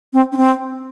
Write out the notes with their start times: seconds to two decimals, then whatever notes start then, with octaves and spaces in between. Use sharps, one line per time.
0.13 C4
0.32 C#4
0.37 C4